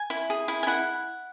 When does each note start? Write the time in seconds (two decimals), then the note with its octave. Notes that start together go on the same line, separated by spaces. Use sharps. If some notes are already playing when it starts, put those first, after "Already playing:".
Already playing: G#5
0.10 E4
0.30 G#4
0.48 E4
0.63 G#5
0.67 E4 F#5